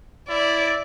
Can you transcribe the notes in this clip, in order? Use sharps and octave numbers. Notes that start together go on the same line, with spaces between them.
E4 D5